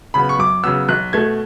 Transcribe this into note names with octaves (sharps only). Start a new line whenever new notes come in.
C#3 F#3 B3 B5
C#6
F#2 D6
C#3 F#3 B3 E6
B1 F#6
B2 A3 G#6